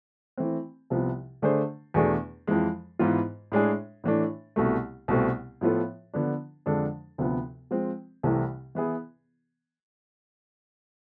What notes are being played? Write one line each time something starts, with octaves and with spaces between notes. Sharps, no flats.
E3 A3 C4
C2 C3 F3 B3
D3 A3 D4 G#4 C5
E2 B2 A3 D4 G#4
F2 E3 G#3
G#2 E3 B3 F4
A2 G#3 D4 G#4
A2 E3 A3 D4
C2 B2 A3
C2 B2 A3 C4
A2 F3 B3 F4 A4
D3 F3 B3 D4
F2 D3 G#3 D4 A4
D2 C3 F3 B3
F3 G#3 C4
C2 C3 E3 A3 E4
E3 B3 E4 G#4